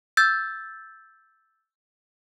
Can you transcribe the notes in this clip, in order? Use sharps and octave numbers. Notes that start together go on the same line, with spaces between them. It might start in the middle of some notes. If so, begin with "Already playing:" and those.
E6 G6 A6